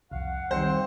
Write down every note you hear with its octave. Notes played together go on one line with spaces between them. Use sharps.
C2 F2 F5 F#5
D#3 G3 C4 C5